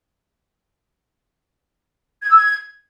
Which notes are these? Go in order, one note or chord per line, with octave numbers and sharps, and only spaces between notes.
G#6
E6
G#6